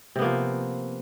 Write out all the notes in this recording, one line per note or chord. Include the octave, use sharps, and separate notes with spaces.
C3 F3 A#3 B3